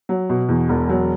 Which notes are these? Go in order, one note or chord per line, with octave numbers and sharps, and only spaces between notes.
F#3
B2
E2
E1
F#3